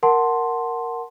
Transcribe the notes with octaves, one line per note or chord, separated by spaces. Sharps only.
A#4 F#5 A5 C6